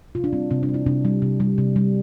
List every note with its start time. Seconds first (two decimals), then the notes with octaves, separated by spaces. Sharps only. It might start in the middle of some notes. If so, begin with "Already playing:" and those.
0.15 C3 F4
0.24 D4
0.33 G3 C4
0.51 C3 C4
0.63 D4
0.69 G3
0.74 E4
0.86 C3 D4
1.05 G3
1.22 C3
1.40 G3
1.58 C3
1.76 G3